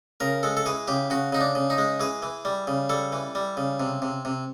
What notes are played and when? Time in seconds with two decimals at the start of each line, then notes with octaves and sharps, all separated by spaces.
0.20 C#3 A#4
0.43 G#3 A4
0.57 A4
0.66 E3 G#4
0.88 C#3 G4
1.10 C#3 F#4
1.32 C#3 D#4
1.41 D4
1.55 C#3
1.70 D#4
1.78 G#3
2.00 E3 G#4
2.22 E3
2.45 G3
2.67 C#3
2.89 G3 A4
3.12 E3
3.35 G3
3.57 C#3
3.80 C3
4.02 C3
4.25 C3